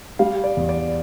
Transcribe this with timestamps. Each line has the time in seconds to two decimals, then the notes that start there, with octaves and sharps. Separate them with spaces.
0.19 G3 F5
0.44 D5
0.57 E2
0.69 D5